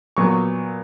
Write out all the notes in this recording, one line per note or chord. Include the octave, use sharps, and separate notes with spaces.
A#2 F#3 B3 C#6